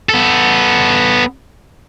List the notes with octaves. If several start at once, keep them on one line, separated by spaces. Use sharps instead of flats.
B3 A4